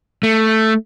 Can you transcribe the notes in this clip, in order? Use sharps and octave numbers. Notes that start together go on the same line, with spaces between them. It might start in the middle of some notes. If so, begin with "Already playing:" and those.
A3